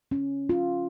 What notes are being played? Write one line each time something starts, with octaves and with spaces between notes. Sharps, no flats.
C#4
F4